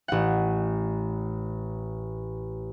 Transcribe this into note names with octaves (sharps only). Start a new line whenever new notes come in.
A1 F#5